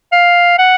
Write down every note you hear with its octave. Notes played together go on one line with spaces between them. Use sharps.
F5
F#5